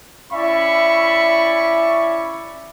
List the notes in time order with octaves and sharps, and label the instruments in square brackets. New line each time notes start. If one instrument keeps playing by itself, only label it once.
[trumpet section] C#4 E4 D5 E5 B5 C#6